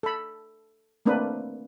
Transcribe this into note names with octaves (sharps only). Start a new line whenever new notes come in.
A4 B5
A3 A#3 C4 D4 B4